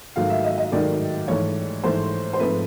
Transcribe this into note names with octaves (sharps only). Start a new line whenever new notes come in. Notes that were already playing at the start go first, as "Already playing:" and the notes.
G#2 D#3 F#3 A3 F5
E5
D#5
D#5
G#2 D#3 F#3 A3 D5
G#2 E3 A3 C#5
G#2 E3 A3 C5
C5
G#2 F3 A3 C4 B4